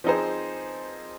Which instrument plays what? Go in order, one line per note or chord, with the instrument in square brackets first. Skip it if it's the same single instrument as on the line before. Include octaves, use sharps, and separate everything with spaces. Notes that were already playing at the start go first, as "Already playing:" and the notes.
[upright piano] F3 C4 D#4 G#4 C5